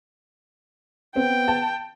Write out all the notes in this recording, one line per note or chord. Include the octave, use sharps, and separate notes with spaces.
B3 C4 G5
A5